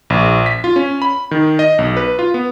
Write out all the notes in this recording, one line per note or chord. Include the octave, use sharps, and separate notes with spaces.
A#1
B6
F4
C#4
B5
D#3
D#5
B1
B4
F4
B3